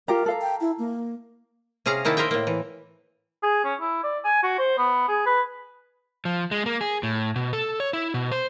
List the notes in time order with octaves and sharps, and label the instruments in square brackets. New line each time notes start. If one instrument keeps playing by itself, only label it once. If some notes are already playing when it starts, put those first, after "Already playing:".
[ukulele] F4 G4 A#5 [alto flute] A#4
[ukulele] A4 F5 A#5
[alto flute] G5
E4
A#3
[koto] C3 C#4 G#4 F5 A#5
D#3 A#3 D#4 E4 A5
A#4 C5 D#5 E5 G5
A2 A#3
E3
[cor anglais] G#4
C#4
E4
D5
G#5
F#4
C5
B3
G#4
B4
[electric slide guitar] F3
G#3
A#3
G#4
A2
B2
A4
C#5
E4
B2
C5